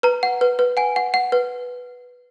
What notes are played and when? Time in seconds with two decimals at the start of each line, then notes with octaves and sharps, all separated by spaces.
0.03 B4 A#5
0.23 F#5
0.41 B4
0.59 B4
0.77 F#5 G#5
0.96 F#5
1.14 F#5
1.32 B4